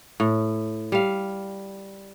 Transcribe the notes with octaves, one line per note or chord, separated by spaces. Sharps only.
A2
G3 F5